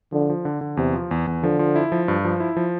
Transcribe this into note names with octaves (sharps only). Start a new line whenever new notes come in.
D3 F3
F3
D3
D3
E2 C3
F3
E2
E2
D3 F3
F3
E4
F3
G2
F3
E4
F3